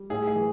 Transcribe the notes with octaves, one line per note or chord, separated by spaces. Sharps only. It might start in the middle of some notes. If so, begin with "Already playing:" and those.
Already playing: G3
A2 G#4
G#4
E3